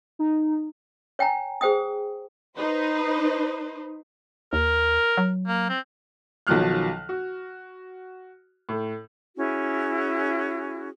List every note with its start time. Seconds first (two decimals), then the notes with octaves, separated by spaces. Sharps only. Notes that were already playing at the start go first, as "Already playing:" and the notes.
0.19 D#4
1.19 C#5 G5 G#5 A#5
1.61 G#4 C5 G5 D#6
2.57 D#4 B4 C5
4.53 D#2 A#4
5.17 F#3
5.48 A#3
5.69 C4
6.47 B1 D#3 F3 F#3 F6 F#6
7.09 F#4
8.69 A2
9.37 C#4 E4 F#4 G#4